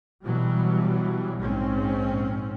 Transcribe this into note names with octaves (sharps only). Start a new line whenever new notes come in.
B2 E3 F#3 G3
A#1 G#2 C4 C#4